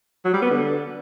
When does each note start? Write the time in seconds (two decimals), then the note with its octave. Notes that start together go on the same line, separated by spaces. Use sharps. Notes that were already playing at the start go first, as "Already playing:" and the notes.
0.25 F#3
0.33 G3
0.42 B3
0.50 D3